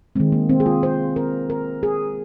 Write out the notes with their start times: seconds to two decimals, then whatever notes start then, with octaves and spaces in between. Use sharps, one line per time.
0.16 D#3 G#3 C4
0.32 A#3
0.49 C4
0.60 G#4
0.66 F4
0.83 C5
1.16 A#4
1.50 A#4
1.83 G#4